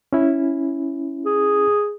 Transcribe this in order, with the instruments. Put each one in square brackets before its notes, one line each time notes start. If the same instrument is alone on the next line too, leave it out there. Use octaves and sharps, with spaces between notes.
[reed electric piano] C#4 E4
[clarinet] G#4